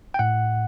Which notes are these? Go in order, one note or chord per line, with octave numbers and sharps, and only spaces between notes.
G5
A2 F#5